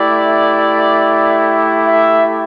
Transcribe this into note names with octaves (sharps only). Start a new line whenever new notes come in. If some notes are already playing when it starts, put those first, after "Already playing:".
Already playing: A3 E4 G4 D5
E5